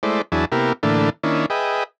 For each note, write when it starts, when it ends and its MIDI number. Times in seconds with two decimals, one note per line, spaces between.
0.03 0.22 56
0.03 0.22 57
0.03 0.22 64
0.03 0.22 72
0.03 0.22 74
0.32 0.45 40
0.32 0.45 54
0.32 0.45 62
0.32 0.45 64
0.32 0.45 68
0.32 0.45 81
0.52 0.73 48
0.52 0.73 58
0.52 0.73 59
0.52 0.73 64
0.52 0.73 67
0.52 0.73 70
0.83 1.10 45
0.83 1.10 50
0.83 1.10 52
0.83 1.10 57
0.83 1.10 58
0.83 1.10 62
1.23 1.46 51
1.23 1.46 58
1.23 1.46 61
1.23 1.46 62
1.23 1.46 64
1.50 1.84 68
1.50 1.84 71
1.50 1.84 75
1.50 1.84 76
1.50 1.84 79